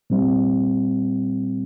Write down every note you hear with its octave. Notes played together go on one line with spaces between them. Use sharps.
A#2 G3 C4